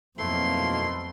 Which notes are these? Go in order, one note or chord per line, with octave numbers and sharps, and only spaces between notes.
B1 F2 B2 A3 A#3 C4 E4 C6